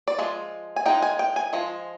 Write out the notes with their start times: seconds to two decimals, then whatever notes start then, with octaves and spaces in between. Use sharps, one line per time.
0.08 D5
0.19 F3 G#3
0.76 G#5
0.86 F3 G#3 D#4 G5
1.02 G#5
1.19 G5
1.36 G#5
1.53 F3 G#3